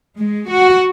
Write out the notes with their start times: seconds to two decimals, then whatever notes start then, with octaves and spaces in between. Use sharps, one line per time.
0.18 G#3
0.49 F#4